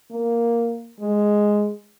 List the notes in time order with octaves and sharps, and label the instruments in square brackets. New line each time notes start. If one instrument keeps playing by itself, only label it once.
[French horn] A#3
G#3